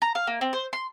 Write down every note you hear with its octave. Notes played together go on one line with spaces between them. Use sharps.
A#5
F5
A#3
C4
C5
C6